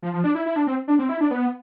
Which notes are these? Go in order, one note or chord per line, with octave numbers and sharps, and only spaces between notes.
F3
F3
D4
E4
E4
D4
C4
D4
C4
E4
D4
B3